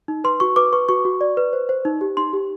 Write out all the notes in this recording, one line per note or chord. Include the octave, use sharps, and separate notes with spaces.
D#4
B4 C6
F#4 C#6
B4 D6
B4 C#6
F#4 C#6
F#4
D5
B4
C5
C5
D#4
G4
D#4 C6
G4